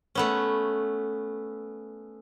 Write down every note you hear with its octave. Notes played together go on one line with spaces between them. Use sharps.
A3 B3 C#4